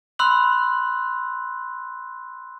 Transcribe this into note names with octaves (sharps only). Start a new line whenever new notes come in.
B5 C6 E6 F#6 F#7